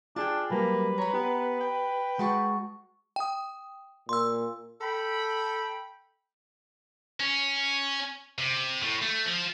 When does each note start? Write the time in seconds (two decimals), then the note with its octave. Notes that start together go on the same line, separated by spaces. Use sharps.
0.16 D4 F4 G4 G#4 A5
0.51 F#3 G3 A#3 B4
0.98 C#5 A#5 B5
1.14 B3 G4
1.60 G5
2.19 G#3 F#4 A5 C#6
3.16 G5 D#6
4.09 A#2 C6 E6
4.81 A4 G5 B5
7.20 C#4
8.38 C3
8.83 A2
9.02 A3
9.26 F3